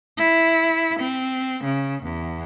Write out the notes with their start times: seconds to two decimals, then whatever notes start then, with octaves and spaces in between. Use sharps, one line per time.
0.17 E4
1.00 C4
1.64 C#3
2.03 E2